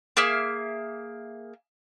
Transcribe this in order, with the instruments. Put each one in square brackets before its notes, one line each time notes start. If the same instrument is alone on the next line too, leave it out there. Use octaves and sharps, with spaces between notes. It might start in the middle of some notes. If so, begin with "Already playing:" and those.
[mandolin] A#3 G#4 E5 F6